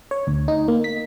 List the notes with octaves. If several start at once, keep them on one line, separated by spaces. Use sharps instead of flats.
C#5
D2
D#4
A#3
B6